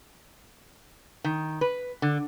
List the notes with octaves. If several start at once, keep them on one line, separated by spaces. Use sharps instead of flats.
D#3
B4
D3